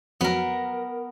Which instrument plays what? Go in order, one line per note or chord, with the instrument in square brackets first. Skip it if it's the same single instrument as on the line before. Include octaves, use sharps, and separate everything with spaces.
[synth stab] F2 F#3 [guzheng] B3 A#4